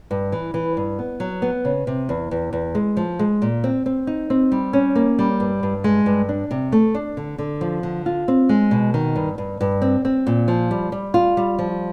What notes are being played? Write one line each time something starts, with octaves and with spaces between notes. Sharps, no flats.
G2
E3
E3
G2
B3
F#3
B3
C#3
C3
E2
E2
E2
G#3
F3
G#3
A#2
C4
C4
D#4
C4
G3
C#4
A#3
G3
G2
G2
G#3
G2
D4
C3
A3
D4
D3
D3
F3
D3
F4
C4
G#3
B2
D#3
G2
G2
G2
C4
C4
A#2
F3
G3
G3
F4
G3
F3